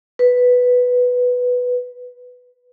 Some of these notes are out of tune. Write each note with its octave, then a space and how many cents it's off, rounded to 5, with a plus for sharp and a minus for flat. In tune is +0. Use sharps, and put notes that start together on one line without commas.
B4 +0